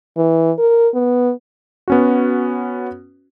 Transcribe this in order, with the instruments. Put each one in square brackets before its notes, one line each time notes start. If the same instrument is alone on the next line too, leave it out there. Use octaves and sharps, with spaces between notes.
[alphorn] E3
A#4
B3
[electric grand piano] B3 C#4 F#4